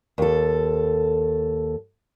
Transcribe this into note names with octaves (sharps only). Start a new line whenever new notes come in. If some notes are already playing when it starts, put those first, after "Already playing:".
D#2 A4